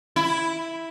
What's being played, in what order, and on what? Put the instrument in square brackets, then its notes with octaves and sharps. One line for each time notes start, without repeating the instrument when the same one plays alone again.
[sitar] E4